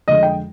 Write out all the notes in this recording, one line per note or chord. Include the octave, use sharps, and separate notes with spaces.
F2 D3 G#3 D#5
G5